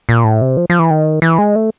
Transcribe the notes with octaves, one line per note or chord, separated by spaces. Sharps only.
A#2
A2
C3
F3
F3
E3
D#3
E3
G#3
A3